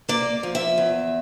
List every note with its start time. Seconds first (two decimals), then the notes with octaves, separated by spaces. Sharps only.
0.09 A#3 D5
0.43 F3
0.55 E5
0.78 E2